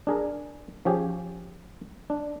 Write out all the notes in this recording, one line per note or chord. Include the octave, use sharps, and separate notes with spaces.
D4 G#4 A#4
F3 C#4 G4 G#4
D4